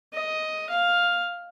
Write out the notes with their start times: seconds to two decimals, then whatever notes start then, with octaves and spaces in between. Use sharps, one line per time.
0.13 D#5
0.70 F5